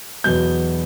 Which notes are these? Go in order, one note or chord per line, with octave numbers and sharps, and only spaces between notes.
E2 B2 F#3 B3 G6